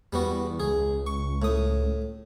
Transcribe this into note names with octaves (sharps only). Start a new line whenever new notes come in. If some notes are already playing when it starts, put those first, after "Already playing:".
E2 G3 B3 F#4
C#2 G#4
C#6
A2 D#6